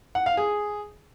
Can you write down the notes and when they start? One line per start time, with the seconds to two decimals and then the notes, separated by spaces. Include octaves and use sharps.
0.15 F#5
0.26 F5
0.37 G#4